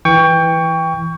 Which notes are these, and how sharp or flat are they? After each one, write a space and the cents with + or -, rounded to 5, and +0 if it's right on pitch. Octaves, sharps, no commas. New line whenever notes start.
E3 +0 G5 +20 C#6 +20